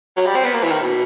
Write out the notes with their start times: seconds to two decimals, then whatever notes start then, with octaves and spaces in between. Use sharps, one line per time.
0.17 F#3
0.26 G3
0.35 C4
0.45 B3
0.54 A#3
0.63 E3
0.72 D#3
0.81 B2